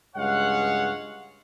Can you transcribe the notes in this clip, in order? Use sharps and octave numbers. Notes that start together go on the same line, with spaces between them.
C#2 G2 G#3 C#5 F5 F#5